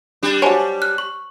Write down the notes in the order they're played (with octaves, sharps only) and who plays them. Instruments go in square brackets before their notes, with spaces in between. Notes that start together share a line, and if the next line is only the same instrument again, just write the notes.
[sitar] G3 D4
[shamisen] F#3 C#5 [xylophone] C5 G#5 A5
[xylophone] F6 F#6
C#6